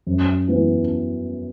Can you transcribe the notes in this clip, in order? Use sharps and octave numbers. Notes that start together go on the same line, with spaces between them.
F#2
E3 B3